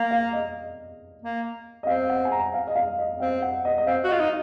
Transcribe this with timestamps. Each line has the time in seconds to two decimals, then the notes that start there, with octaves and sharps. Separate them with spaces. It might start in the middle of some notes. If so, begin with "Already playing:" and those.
Already playing: A#3 F5
0.11 F5
0.33 D#5
1.22 A#3
1.83 D#5
1.87 C4 F5
2.09 F#5
2.25 G#5
2.32 A#5
2.54 F5
2.67 D#5
2.76 F5
2.99 D#5
3.20 C4 F5
3.42 F#5
3.65 D#5
3.78 D#5
3.87 C4 F5
4.04 F#4
4.08 F4 D#5
4.20 D#4